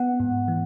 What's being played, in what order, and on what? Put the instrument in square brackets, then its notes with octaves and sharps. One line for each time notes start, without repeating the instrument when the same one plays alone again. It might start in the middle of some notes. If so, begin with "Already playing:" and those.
Already playing: [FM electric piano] B3 F#5
G#2
E3